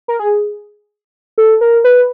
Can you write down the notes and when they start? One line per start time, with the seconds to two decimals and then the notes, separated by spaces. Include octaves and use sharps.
0.08 A#4
0.19 G#4
1.38 A4
1.61 A#4
1.84 B4